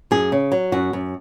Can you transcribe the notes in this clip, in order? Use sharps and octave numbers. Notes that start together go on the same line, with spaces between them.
F#2 G#4
C#3
F#3
F#2 F#4
F#2